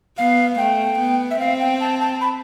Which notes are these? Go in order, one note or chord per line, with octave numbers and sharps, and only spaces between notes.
B3 F5
A3 G5
B3
E5
C4 F5
G5
A5
A5
B5